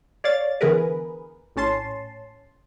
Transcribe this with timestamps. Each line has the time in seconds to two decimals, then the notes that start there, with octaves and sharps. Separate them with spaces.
0.24 C#5 D5 F5 A6
0.61 D3 E3 B3 G#4 A#4 B4
1.56 A#1 A2 C#4 A5 C6